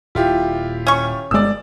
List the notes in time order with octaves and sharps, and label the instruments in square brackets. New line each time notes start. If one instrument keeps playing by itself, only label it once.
[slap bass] D#1 A#2 [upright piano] E4 F4 G4
[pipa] C#4 C#6
[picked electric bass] G1 G#3 [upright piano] D5 E6